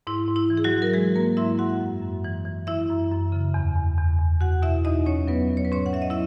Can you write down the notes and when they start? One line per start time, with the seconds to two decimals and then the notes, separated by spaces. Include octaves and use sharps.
0.07 G#2 E4
0.28 G#2
0.36 E4
0.50 E3
0.57 G#4
0.64 F#3 F#4
0.72 E3
0.82 A#4
0.94 E3 G#3 G#4
1.15 G#2 A#3 A#4
1.37 G#2 E4 E5
1.59 G#2 F#4 F#5
1.80 F#2
2.02 F#2
2.24 E3
2.45 E3
2.67 E3 E4 E5
2.90 F#2
3.11 F#2
3.32 C#3
3.54 E2
3.76 E2
3.97 E2
4.19 E2
4.41 E2 F#4 F#5
4.62 B2 E4 E5
4.85 E2 D#4 D#5
5.06 F#3 C#4 C#5
5.28 F#3 B3 B4
5.50 F#3
5.57 C#5
5.65 B4
5.72 G#2 C#4 C#5
5.86 F#5
5.93 F#3 E5
6.02 D#5
6.10 E4 E5